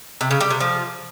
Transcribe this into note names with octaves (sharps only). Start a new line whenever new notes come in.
C3
C#3
G3
C3
F3